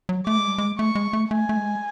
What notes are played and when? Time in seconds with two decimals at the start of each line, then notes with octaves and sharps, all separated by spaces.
0.09 F#3
0.27 A3 D6
0.38 G#3
0.47 G3
0.58 G#3
0.78 A3 C#6
0.95 G#3
1.13 A3
1.31 A3 G#5
1.49 A3
1.57 G#3